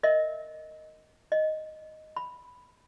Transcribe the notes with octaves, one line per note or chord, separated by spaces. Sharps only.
A#4 D#5 E5
D#5
B5